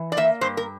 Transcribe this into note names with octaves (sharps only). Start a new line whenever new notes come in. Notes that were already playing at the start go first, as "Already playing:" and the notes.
Already playing: E3
D5
A#3 E5
G2 C5
A#4